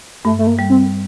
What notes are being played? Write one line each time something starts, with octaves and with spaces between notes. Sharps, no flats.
G2 A3
A3
A#3
G3
C4